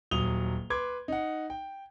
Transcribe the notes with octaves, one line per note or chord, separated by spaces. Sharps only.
D#1 F#3 D#6 F7 G7
B4 C6 D6 G#6
D#4 F#5
G5